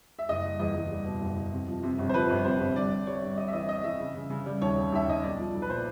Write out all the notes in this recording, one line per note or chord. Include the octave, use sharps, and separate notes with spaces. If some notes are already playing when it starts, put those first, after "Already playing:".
E5
F#1 D#5
G3
E2 D#5
E2
G3
B2
F#1
F#1
C3
F3
C3
G1
C5
F3 B4
G1
C3 C5
G1
G2 D5
G3
G3 C#5
G2
G3 D#5
E5
E3 D#5
G3 D#5
E3 E5
C#3
C#3
C#3
G3
D#2 C#5
C#3
D#2 E5
D#2 D#5
B1 D5
F3
B1
B4
A#2 C5